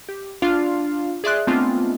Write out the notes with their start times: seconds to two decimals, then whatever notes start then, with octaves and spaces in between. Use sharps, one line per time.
0.09 G4
0.42 D4 F4 D5 F5
1.24 G#4 D5 E5 C6 F#6
1.47 G#3 A3 B3 C4 D4 F4